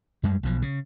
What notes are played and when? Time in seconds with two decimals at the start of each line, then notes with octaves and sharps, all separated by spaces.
0.23 F#2 G3 G#3
0.43 B1 B2 F3
0.62 C#3